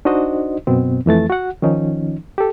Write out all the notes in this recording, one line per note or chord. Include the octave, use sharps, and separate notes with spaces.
D4 D#4 F#4 C5 D#5
F#2 B2 B3 C4
F2 E3 A3 A6
F#4 F#5
D#3 F3 C#4 D#4
G4 A4